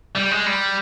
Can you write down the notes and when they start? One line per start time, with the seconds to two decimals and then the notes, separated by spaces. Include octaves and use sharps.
0.16 G3
0.31 G#3
0.46 G3